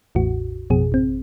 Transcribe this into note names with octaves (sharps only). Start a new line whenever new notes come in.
A1 E2 A2 F#4
A1 F2 B2 G#4
G#1 C4